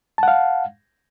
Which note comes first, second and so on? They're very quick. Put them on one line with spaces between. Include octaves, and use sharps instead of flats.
A5 F#5 F5